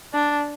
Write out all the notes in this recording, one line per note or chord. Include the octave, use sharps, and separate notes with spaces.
D4